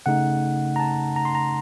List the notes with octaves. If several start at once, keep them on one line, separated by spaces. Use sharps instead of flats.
C#3 A3 D#4 F#5
A#5
A5
A#5
C6
A#5